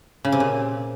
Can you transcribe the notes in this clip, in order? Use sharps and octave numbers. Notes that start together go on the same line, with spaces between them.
C#3
C3
A#2